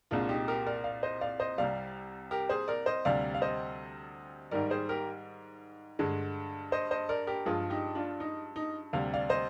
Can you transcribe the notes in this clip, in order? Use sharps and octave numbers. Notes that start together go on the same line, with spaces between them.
C2 A#2 G#3 D4 F4
D#4 G4
G4 A#4
A#4 D5
D5 F5
C5 D#5
D5 F5
C5 D#5
C2 C3 G3 D5 F5
G4 A#4
G#4 C5
A#4 D5
C5 D#5
D2 C3 G3 D5 F5
F5
C5 D#5
G#2 D#3 G3 A#4 D5
G#4 C5
G4 A#4
G2 D3 G#3
C5 D#5
C5 D#5
A#4 D5
G4 A#4
G2 F3 G#3 F4 G#4
D#4 G4
D4 F4
D#4
D#4
D2 C3 G3 F5
D5 F5
C5 D#5